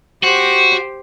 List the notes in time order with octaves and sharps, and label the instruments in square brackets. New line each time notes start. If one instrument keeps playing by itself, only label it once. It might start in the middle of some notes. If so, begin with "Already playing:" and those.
[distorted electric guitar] F#4 [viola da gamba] G4 C5